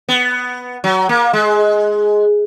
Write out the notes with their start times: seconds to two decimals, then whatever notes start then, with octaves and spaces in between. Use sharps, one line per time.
0.09 B3
0.84 F#3
1.09 A#3
1.33 G#3